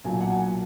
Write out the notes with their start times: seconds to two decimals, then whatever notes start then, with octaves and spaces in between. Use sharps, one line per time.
0.04 B1 A#2 F#3 G#5
0.21 F#5
0.30 G#5